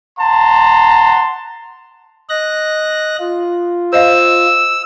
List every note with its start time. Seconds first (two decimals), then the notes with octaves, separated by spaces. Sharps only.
0.18 F#5 A5 A#5 C6
2.29 D#5 F#6 A#6
3.19 F4
3.93 C5 D#5 F5 E6